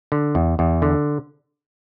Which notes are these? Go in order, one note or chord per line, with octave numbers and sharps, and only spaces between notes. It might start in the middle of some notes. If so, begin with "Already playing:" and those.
D3
E2
E2
D3